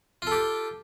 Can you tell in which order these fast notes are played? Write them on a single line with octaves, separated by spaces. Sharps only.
F4 A4 G4